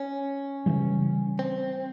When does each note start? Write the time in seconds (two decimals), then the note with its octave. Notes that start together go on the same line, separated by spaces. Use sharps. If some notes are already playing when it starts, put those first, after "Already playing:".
Already playing: C#4
0.66 C#3 E3 G3
1.39 C4